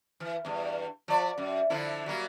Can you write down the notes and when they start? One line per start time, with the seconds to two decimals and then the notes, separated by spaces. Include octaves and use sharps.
0.20 E3
0.45 E2 G2
1.08 F3 D5
1.38 F#2
1.70 D3 F3 E4
2.06 F#3 G3 A#3